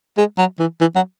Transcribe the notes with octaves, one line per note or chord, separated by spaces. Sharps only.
G#3
F#3
E3
E3
F#3